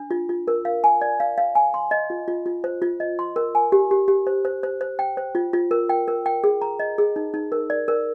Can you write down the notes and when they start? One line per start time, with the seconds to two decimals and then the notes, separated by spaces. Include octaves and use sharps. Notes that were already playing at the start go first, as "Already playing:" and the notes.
Already playing: D4
0.11 F4
0.29 F4
0.48 A#4
0.65 F5
0.84 G#5
1.01 D5
1.20 F5
1.38 F5
1.55 G#5
1.74 C6
1.91 D#5
2.10 F4
2.28 F4
2.46 F4
2.64 C5
2.82 F4
3.00 D#5
3.19 C6
3.36 A#4
3.55 G#5
3.72 G4
3.91 G4
4.08 G4
4.27 C5
4.45 C5
4.63 C5
4.81 C5
4.99 G5
5.17 C5
5.35 F4
5.53 F4
5.71 A#4
5.89 G5
6.08 A#4
6.26 G5
6.44 G#4
6.62 A#5
6.79 D#5
6.98 G#4
7.16 D#4
7.34 D#4
7.52 A#4
7.70 D5
7.88 A#4